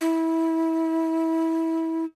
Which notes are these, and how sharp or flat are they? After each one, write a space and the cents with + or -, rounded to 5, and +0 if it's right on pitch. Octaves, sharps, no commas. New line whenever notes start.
E4 -20